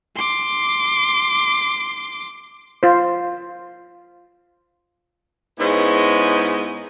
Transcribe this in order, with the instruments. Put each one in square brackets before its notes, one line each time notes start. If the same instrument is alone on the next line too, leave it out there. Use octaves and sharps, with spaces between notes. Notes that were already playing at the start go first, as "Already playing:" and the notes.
[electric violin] C6 D6
[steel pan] F4 C5
[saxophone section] G#2 G#3 B3 C#4 D#4 E4